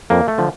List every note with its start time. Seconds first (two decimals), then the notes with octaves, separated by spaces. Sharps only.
0.10 F2 A#3
0.28 A3
0.38 D3 F3